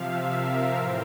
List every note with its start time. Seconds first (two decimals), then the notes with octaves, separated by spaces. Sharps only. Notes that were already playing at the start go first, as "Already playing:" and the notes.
Already playing: C3 F3 E5 F5
0.29 A#4
0.74 A2 E3 C5